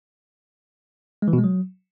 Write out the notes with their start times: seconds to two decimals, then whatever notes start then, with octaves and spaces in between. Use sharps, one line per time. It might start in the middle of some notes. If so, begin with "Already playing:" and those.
1.22 G#3
1.28 E3
1.33 B2
1.38 G#3
1.44 F#3